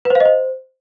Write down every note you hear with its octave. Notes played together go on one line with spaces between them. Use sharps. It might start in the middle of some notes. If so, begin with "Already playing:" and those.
B4
C5
F5
D#5
C5